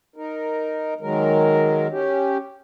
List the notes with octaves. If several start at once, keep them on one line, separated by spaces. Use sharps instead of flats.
D#4 A#4
D#3 F#3 G#3 A#4
C#4 G4